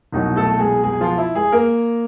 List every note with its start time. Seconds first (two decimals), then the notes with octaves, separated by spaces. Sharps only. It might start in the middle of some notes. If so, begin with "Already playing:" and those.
0.13 C2 B2 F#3 D#4
0.36 A3 A4
0.60 G#3 G#4
0.83 G#3 G#4
1.00 F3 F4
1.18 E4
1.35 G#3 G#4
1.52 A#3 A#4